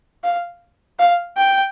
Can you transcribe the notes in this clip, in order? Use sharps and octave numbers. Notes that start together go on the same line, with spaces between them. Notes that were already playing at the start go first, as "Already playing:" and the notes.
F5
F5
G5